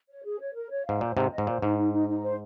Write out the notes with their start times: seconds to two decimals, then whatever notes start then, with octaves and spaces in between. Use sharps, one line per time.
0.09 C#5
0.24 G#4
0.39 C#5
0.55 A#4
0.70 C#5
0.85 G#2 F5
1.01 A#2 C5
1.17 G#2 C3 C5
1.31 D#5
1.38 G#2
1.47 A#2 C5
1.62 G#2 D#4
1.78 D#4
1.93 D#4
2.08 D#4
2.24 C5